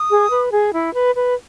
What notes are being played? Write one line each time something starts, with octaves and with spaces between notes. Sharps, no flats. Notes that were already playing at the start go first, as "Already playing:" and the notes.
Already playing: D#6
G#4
B4
G#4
E4
B4
B4